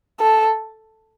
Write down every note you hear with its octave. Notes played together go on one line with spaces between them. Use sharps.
A4